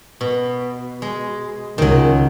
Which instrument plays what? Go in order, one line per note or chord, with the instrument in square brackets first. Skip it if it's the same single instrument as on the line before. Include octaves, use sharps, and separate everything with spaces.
[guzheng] B2
G#3
[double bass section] C#2 [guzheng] D#3 F#3